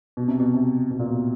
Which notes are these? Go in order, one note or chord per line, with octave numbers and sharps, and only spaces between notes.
B2
C3
B2
C3
B2
A#2
B2